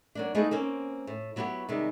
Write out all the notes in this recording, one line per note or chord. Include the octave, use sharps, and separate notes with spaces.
F#3 A#3 D4
G#3 A3 B3 D#4 E4 G#4
A#3 C4 C#4 C5
A2
F#3 B3 E4 F#4 G4
C3 D#3 G3 G#3